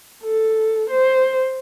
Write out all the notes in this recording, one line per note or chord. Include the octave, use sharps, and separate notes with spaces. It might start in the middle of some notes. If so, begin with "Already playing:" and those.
A4
C5